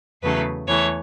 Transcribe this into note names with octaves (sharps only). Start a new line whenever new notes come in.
E2 C#3 F#3 A3 B4
E2 E3 A3 C#5